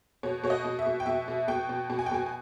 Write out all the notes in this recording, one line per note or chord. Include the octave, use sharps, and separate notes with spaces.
B2 C#5
B2 C#5
D#5
B2
E5
B2
G5
B2 E5
B2
B2 G5
B2
B2
G#5
G5
B2 G#5
G#5